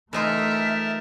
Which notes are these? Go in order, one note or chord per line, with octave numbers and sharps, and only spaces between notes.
E3 A3 D#4 F4 A#4 E5 A5